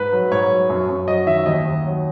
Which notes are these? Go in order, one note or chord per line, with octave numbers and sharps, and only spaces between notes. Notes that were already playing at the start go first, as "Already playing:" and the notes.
Already playing: G#2 B4
F#3
G#2 C#5
F#3
F#2
F#2
F#3 D#5
D#3 E5
D#2 D#5
D#2
F#3